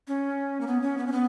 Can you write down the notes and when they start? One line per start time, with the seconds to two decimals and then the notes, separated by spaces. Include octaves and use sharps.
0.08 C#4
0.61 A#3
0.67 B3
0.82 C#4
0.98 B3
1.07 C#4
1.12 B3